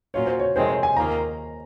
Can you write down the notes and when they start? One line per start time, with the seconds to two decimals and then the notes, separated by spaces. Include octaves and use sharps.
0.14 A#2 F#3 C#4 F4 C#5
0.27 C5
0.39 C#5
0.55 F2 C3 D#3 G#3 C4 C5
0.69 C#5
0.83 G#5
0.97 D#2 D#3 A#3 F4 A#5